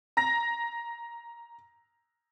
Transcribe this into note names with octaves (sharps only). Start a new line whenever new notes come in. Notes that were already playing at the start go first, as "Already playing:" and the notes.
A#5 A#6